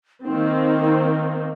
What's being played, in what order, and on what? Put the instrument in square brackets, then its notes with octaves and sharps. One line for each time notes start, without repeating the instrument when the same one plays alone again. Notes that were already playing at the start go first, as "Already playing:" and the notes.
[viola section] D#3 A#3 C4 [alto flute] D#4